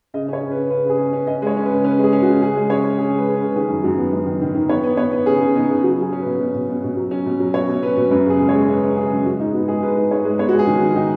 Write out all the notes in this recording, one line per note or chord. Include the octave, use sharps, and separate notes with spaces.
C#3 D#5
C#4 C#5
C#3
B4
C#3
C#3 B4
C#3 G#4
C#4
B4
C#4
C#4 D#5
G#3 C#5
C#4
B4
C#3
C#4 B4
G#3
G#4
C#4
F#4
C#3
C#3 G#4
G#3
C#4 C#5
C#4
C#3 G#4
G#3 B4
C#3
B4
C#3
D#3 G#4
F#2
F#2 F#4
B3
F#2
D#3
D#3
D#3
B3 C#5
B3
B3 C#5
B3
C#3 G#4
C#3
B3 D#4
C#3
F#3 F#4
F#3 G#4
C#4
B2 B4
B2
B2
B2
B2
F#3
C#4
B2
F#3
B2 C#5
B2
C#4 B4
B2
F#2 B4
C#3 G#4
G#3
C#5
G#3
C#3 B4
C#3
C#3 G#4
F#2
G#3 F#4
G#2 D#4
B3 F#4
G#3 G#4
G#2 B4
G#2
G#2 C#5
G#3
B3 C#5
F#4
G#3
G#4
D#3
F#4
D#3
D#3 D#4